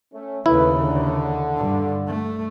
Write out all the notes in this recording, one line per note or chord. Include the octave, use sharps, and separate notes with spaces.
A3 C#4
D#2 C#3 A3 E4 B4
D3
G2
A3